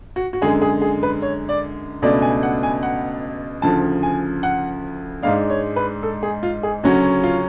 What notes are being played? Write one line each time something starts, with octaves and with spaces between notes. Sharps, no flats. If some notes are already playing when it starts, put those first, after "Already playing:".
F#4
F#4
F#2 D3 G#3 G#4
G#4
G#4
B4
C#5
D5
C#2 B2 A3 D4 D5
G#5
F#5
G#5
F#5
D2 C#3 F3 A5
G#5
F#5
G#2 G#3 D4 F5
C#5
B4
A4
G#4
F4
G#4
D2 C#3 F#3 C#4 F#4
F4